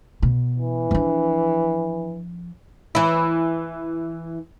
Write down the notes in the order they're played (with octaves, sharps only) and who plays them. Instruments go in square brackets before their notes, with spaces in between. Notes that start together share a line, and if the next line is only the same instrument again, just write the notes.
[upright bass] B2
[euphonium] E3
[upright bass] F3 D4
[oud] E3 E4